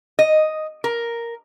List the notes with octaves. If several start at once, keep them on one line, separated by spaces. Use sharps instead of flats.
D#5
A#4